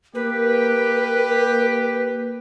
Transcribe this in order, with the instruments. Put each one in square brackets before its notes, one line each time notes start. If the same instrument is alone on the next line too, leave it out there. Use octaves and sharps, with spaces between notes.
[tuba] A#3 [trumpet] G4 [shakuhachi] A#4 [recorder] B4